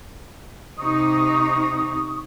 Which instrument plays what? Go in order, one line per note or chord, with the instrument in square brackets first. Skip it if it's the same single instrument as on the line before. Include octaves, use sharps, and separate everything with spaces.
[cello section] C3 D#4 [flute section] C#6 D#6